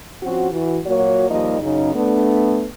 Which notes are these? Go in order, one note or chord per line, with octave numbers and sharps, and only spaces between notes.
F3 C4 C#4 F#4
E3 F#4
A#2 F#3 A#3 F#4 C#5
D#2 F3 G3 A#3 D#4 D#5
F#2 C#3 D#4
A3 B3 D4